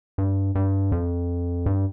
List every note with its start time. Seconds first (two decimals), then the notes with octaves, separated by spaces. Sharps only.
0.18 G2
0.55 G2
0.92 F2
1.66 G2